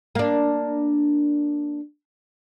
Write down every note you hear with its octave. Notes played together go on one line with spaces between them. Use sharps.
A#3 D4